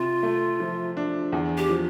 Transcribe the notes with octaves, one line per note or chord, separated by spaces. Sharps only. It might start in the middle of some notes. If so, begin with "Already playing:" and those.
Already playing: C3 F4
A3
F3
D4
E2
G4
F3